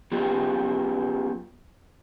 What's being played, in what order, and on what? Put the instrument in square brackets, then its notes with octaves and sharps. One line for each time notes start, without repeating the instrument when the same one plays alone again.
[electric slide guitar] F#3 B3 C#4 F4 G4